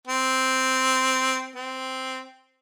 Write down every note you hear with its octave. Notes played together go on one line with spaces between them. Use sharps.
C4
C4